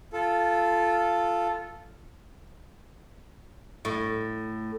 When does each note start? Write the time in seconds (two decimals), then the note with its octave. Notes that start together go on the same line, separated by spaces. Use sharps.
0.13 F4 A4
3.85 A2